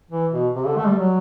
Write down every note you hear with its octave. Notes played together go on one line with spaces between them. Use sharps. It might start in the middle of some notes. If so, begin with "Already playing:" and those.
E3
B2
C3
D3
A3
G3
F#3